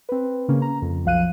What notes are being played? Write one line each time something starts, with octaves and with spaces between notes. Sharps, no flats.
C4 B4
C#3 A#3 C#4
A#5
F2
B1 F3 F5 F#6 D#7